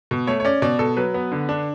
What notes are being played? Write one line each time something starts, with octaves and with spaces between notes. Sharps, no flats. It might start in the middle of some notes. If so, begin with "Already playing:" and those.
B2
A3 C#5
C#5
C#4 D5
B2 D5
B2 A4
F#3 B4
B3
D3
D4